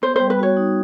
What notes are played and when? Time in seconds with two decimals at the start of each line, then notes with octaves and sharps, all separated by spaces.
0.02 B3 C5
0.16 G3 C5
0.30 B4
0.39 F#4 C#5
0.57 D#4